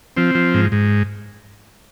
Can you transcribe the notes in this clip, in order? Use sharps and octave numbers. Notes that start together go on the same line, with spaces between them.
F3 C4
F3
G#2
G#2